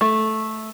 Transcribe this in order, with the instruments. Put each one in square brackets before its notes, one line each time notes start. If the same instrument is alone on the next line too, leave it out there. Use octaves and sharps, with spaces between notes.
[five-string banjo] A3